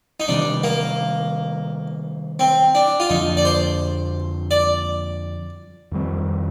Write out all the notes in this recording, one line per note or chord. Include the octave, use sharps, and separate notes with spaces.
D#4
C3 D#3 G3 D4
A#3
C4
D4
F4
F2 D3 F3 D#4
D5
C5
D5
F2 D#3 G3 C4